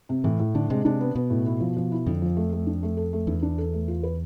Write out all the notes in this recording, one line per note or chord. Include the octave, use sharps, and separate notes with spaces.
C3
A2 E3
A2
D3 D4
C3 G#3
C3 D4
B3
B2 B3
A2
E4
F3
F3
E4
F2 D3
F3
A3
A3
D4
A3
A4
A3
E2 D4
D4
A4
A3
F4
B4